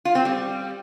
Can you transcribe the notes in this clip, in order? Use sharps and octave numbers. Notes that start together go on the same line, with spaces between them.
F4
C4
G3